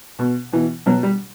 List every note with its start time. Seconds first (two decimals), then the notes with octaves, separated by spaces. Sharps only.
0.19 B2
0.53 B2 E3
0.86 B2 F#3
1.03 G3